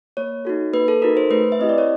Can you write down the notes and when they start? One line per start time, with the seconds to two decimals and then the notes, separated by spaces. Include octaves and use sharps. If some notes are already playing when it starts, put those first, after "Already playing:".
0.17 A#3 C#5
0.45 D#4 F#4 A4
0.73 A#3 B4
0.88 A4
1.02 D#4 F#4 A4 A#4
1.17 C5
1.30 A3 B4
1.52 E5
1.59 C4 E4 G4 D#5
1.69 D5
1.78 C#5